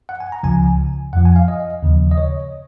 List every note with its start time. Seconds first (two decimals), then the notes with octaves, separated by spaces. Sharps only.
0.09 F#5
0.20 G#5
0.32 A#5
0.43 C#2 C#3 F3 G#5
1.13 F2 F3 F#5
1.25 G#5
1.36 F5
1.48 D#5
1.83 D#2 C#3 F3
2.11 D#5
2.18 C#5